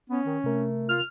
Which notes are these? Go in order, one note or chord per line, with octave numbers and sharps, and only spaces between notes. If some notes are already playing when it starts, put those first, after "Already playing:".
B3 C#4
D#3
C3 A3 A#4
F4 F6